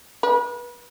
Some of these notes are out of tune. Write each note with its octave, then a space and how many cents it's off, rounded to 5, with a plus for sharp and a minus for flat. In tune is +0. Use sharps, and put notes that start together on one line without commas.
B4 -35